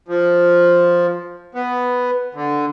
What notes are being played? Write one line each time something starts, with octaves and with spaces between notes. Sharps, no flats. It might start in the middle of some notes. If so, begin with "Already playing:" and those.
F3
B3
D3